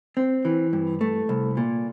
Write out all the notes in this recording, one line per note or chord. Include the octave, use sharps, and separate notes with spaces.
C4
E3
G2
A3
C2
A#2